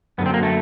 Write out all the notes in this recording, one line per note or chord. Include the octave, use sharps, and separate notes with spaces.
F#2 D3 F#3 A#3 B3
C4
A#3
A3